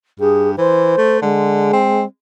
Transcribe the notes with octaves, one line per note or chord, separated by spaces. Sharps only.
G2 G#4
E3 C5
A3
D3 G#3
C4